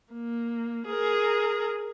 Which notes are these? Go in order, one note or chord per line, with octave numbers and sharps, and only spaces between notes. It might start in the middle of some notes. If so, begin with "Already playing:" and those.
A#3
G#4 A#4